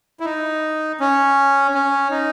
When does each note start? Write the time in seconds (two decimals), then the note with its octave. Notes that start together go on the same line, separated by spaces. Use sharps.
0.20 E4
0.25 D#4
1.00 C#4
1.75 C#4
2.11 D#4